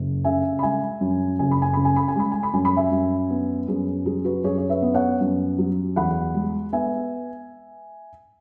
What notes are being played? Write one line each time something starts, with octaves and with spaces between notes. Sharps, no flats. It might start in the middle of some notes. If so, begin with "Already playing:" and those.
Already playing: F#1
C#3 E5 G#5
B5
G#3 E5 G#5
F#2
F#1 G#5
B5
G#5
C#3 B5
G#5
B5
G#5
G#3 B5
G#5
B5
F#2 G#5
B5
E5 G#5
F#2
B3
F#2 G#4
F#3 G#4
F#4 B4
F#2 G#4 C#5
C#5
B4 E5
B3
C#5 F#5
F#2
F#3
E2 F#5 B5
G#3
B3 E5 G#5